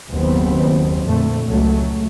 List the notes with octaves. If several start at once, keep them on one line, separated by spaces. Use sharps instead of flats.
F#1 D#2 B3 C4
F2 A#2 D3 A3
C#2 F#3 A3